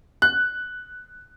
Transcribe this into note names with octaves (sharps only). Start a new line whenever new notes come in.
F#6